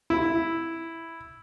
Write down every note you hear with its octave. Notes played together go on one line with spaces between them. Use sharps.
E4